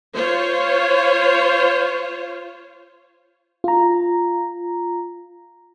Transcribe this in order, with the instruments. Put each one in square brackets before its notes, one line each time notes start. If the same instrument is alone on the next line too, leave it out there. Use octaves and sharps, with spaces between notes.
[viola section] F4 C5 C#5
[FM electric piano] F4 A#5